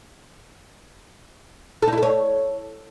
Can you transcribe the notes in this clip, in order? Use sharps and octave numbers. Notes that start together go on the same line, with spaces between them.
A4
D#4
E4
A4
C#5